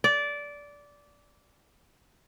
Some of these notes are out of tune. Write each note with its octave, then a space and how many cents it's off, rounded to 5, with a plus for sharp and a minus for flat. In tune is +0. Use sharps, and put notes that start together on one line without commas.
D5 -15